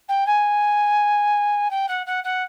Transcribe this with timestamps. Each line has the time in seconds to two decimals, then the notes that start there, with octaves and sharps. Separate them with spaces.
0.08 G5
0.26 G#5
1.70 G5
1.88 F#5
2.06 F#5
2.24 F#5